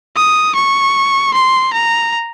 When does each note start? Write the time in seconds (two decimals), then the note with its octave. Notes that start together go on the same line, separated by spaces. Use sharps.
0.16 D#6
0.55 C#6
1.34 C6
1.73 A#5